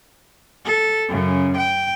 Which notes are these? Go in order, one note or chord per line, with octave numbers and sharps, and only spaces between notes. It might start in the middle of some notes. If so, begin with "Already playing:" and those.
A4
F#2 C#3
G5